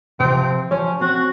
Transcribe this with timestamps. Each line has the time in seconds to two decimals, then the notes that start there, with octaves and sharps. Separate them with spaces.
0.20 C3 F3 C4
0.71 F3 C#4 C#5
1.01 C4 F#4